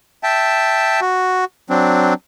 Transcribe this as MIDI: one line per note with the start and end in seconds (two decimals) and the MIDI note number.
0.23 1.00 76
0.23 1.00 79
0.23 1.00 81
1.01 1.45 66
1.70 2.14 54
1.70 2.14 60
1.70 2.14 62